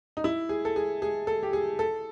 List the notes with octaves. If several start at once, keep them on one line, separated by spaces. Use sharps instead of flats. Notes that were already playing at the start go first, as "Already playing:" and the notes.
D#4
E4
G#4
A4
G#4
G#4
A4
G4
G#4
A4